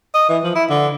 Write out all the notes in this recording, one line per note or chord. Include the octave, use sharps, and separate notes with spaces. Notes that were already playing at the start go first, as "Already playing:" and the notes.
D#5
E3
F3
E4
D3